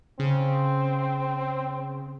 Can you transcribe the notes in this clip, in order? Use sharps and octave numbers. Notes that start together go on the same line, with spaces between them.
C#3 C4